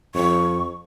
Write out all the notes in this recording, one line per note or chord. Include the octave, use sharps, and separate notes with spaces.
F2 C#6